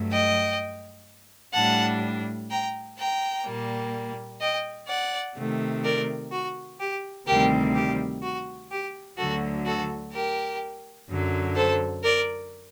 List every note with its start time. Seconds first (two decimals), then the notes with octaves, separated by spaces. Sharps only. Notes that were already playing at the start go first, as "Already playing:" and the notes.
Already playing: G2 F#3 A3
0.10 D#5 G5
1.53 A2 G3 D4 F#5 A5
2.50 G5 A#5
2.97 G5 A#5
3.45 A#2 G3 A#3
4.40 D#5 G5
4.87 D5 F#5
5.35 C3 D#3 A3
5.83 A#4 D5
6.31 F#4
6.79 G4
7.26 D2 C3 D#3 G3 C4 G4 A#4
7.75 G4
8.21 F#4
8.70 G4
9.17 D2 D3 F#3 F#4 A4
9.65 F#4 A4
10.12 G4 A#4
11.09 F#2 D3 F#3
11.55 A4 C5
12.03 A#4 D5